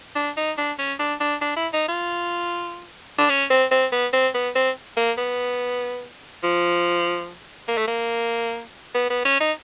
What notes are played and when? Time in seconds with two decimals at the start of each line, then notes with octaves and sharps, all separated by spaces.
0.15 D4
0.37 D#4
0.58 D4
0.79 C#4
0.99 D4
1.21 D4
1.41 D4
1.56 E4
1.73 D#4
1.88 F4
3.18 D4
3.30 C#4
3.50 C4
3.71 C4
3.92 B3
4.13 C4
4.34 B3
4.55 C4
4.97 A#3
5.18 B3
6.43 F3
7.68 A#3
7.78 A3
7.87 A#3
8.94 B3
9.10 B3
9.25 C#4
9.40 D#4